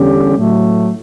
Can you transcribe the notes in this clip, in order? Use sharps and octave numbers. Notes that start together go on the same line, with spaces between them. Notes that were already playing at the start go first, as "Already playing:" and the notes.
Already playing: E2 D3 G3 C#4 G4
A2 F#3 A3